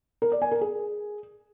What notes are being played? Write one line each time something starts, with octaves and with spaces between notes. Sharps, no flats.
A#4
D5
G#5
A#4
G#4